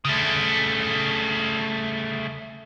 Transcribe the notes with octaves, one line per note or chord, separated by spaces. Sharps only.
C#3 A3